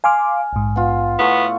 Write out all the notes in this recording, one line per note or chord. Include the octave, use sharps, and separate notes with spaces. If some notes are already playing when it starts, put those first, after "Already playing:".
F5 G#5 C6 D6 F6
A#1 G#2
B3 F4
A2 B3 A4 C#6